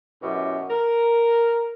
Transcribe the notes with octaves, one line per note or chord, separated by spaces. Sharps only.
F#2 B2 E4 G4
A#4